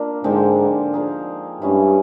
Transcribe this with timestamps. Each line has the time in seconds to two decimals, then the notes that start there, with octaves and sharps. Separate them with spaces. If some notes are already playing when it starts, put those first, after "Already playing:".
Already playing: A#3 D4 F4
0.24 G#2 D3 F3 G#3 C4
0.93 F3 A#3 D#4 G#4
1.62 G2 G#3 C#4 E4